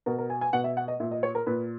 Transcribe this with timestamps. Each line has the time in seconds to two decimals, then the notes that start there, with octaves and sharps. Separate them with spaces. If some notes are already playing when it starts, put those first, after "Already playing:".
0.06 B2 A#4
0.18 A#4
0.30 G#5
0.41 G#5
0.53 B2 F#5
0.64 E5
0.77 F#5
0.88 D#5
1.00 A#2 E5
1.11 D#5
1.23 C#5
1.35 A#4
1.47 A#2 B4